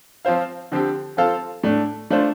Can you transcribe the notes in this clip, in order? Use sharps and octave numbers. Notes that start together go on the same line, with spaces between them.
F3 C4 F4 C5 F5
D3 F3 C4 G4
F3 C4 F4 A4 F5
A2 A3 D4
A3 D4 F4 C5